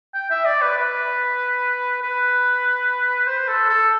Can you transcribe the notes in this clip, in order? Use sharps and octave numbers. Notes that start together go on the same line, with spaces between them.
G5
E5
D5
B4
B4
B4
C5
A4
A4